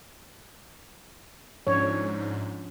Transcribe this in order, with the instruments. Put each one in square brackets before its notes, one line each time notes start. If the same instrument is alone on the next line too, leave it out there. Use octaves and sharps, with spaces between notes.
[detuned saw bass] G#2 [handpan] F3 C#4 D4 [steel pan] C#5